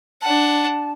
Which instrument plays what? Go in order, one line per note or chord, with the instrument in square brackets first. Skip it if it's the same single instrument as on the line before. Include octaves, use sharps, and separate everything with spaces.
[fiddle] D4 F#5 [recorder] A5